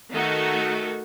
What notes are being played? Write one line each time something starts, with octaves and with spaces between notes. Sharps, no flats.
D#3 A3 D#4 F#4 A4